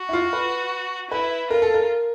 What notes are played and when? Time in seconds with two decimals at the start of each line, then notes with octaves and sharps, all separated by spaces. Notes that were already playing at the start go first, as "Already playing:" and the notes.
Already playing: F#4
0.09 E4
0.13 F4
0.33 B4
1.11 E4 B4
1.50 F4 A#4
1.62 A4
1.74 A#4